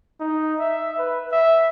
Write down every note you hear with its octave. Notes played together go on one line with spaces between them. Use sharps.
D#4
E5
B4
E5